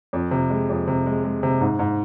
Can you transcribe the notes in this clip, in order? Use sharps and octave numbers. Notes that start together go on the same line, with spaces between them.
F2
C3
G#3
F2
C3
G#3
G#3
C3
G#2
G#2